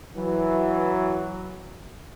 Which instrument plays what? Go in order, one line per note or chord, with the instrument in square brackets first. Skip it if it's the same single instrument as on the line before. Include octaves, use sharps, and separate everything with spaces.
[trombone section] E3 F#3